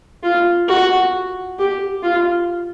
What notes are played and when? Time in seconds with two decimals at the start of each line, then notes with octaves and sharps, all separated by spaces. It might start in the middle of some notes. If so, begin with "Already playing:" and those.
0.23 F4
0.68 F#4
1.58 G4
2.03 F4